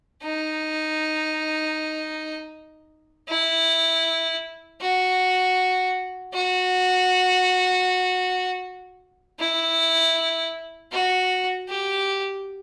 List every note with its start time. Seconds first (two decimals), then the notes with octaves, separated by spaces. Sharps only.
0.23 D#4
3.29 E4
4.82 F#4
6.34 F#4
9.40 E4
10.92 F#4
11.69 G4